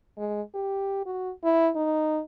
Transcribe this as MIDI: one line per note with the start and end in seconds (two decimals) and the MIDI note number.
0.18 0.42 56
0.54 1.03 67
1.06 1.31 66
1.44 1.70 64
1.76 2.21 63